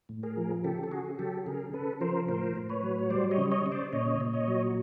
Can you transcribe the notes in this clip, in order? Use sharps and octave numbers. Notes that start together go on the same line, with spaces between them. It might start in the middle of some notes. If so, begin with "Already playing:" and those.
A2
G#4 A#4
F3
C#3 G4 A4
A4
C#3 F#4 G#4
F#3 G4 A4
C#3 G#4 A#4
C#3 A4 B4
F3 A#4 C5
A2 A#4 C5
A2
B4 C#5
F#3
C#5
G3 C5 D5
C#5 D#5
C#3
C#5 D#5
C#3
C5 D5
A#2 C#5 D#5
A#2
C#5 D#5
F#3